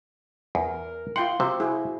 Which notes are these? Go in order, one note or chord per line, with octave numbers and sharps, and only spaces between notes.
E2 A#4
E4 F4 F#5 G5 C6
C3 F#4 C5
E4 G#4